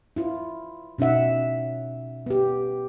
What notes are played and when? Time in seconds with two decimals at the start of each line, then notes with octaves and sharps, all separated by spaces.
0.16 E4 F4
0.98 B2 C#4 D#4 E5 F#5
2.26 B3 G4